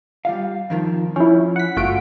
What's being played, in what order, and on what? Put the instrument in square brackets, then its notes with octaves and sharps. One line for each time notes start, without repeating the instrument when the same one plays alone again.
[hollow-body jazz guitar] G3 F4 F5
F2 D#3 F3
[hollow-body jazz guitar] F3 [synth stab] C#4 E4
[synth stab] F#5 B6
[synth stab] G1 F#4 D7 [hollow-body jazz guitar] A3 F4